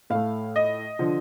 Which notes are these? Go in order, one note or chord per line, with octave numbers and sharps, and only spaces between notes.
A2 A3 F5
D#5
D3 F3